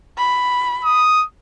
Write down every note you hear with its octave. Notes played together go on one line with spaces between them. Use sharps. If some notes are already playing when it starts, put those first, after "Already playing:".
B5
D#6